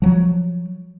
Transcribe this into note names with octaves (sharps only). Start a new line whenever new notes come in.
F3 F#3